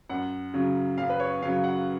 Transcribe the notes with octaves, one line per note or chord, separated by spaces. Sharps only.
F#2 F#5
C#3 F#3
F#2 F5
B4
C#5
C#3 F#3 F5
F#5